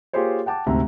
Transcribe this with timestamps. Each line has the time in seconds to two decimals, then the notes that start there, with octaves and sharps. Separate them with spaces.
0.13 A#3 F4 G4 G#4 C5 C#5
0.46 F#5 G5 A5 D6
0.66 D2 G#2 C3 C4 E5 A#5